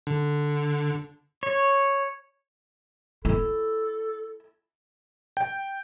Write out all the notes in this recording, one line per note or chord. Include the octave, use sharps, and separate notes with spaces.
D3
C#5
E4 A4
G5